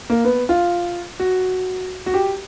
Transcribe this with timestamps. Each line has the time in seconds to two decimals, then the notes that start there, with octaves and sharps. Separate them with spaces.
0.10 A#3
0.24 B3
0.49 F4
1.20 F#4
2.06 F#4
2.14 G4